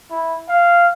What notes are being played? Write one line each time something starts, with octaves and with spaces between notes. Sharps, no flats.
E4
F5